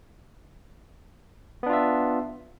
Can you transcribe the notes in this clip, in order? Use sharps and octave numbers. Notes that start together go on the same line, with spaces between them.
B3 D4 F4 E5